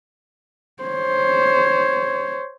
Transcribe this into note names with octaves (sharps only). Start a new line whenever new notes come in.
C5 C#5